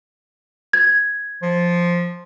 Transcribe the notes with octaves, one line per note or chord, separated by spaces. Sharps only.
G#6
F3